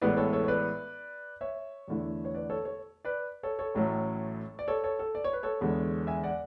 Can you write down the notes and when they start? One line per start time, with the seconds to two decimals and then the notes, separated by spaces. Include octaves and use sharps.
0.02 A1 A2 G#3 B3 E4 B4 D5
0.17 A4 C#5
0.33 A4 C#5
0.44 C#5
0.48 B4 D5
1.41 C#5 E5
1.88 E2 D3 A3 E4
2.25 C#5
2.35 B4 D5
2.50 A4 C#5
2.65 A4 C#5
3.05 B4 D5
3.43 A4 C#5
3.59 A4 C#5
3.75 A1 A2 F#3 A3 C#4
4.59 D5
4.68 A4 C#5
4.84 A4 C#5
4.99 A4
5.15 D5
5.24 C#5
5.33 B4
5.43 A4 C#5
5.61 E2 D3 G#3 B3
6.07 E5 G#5
6.24 D5 F#5